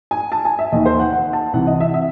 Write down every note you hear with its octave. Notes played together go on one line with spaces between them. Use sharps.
G#5
A5
G#5
E5
D#2 D#3 D#5
C5
F#5
F#5
A5
C2 C3 E3 F#5
D#5
E5
E5